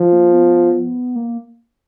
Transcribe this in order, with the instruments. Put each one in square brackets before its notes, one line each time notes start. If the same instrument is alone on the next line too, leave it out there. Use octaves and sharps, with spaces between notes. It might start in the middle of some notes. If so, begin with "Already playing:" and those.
Already playing: [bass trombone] F3
[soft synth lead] A#3
B3
A#3